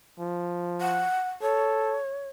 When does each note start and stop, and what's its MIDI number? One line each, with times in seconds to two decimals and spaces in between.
0.19 1.06 53
0.81 1.29 78
1.42 1.99 69
1.42 2.28 73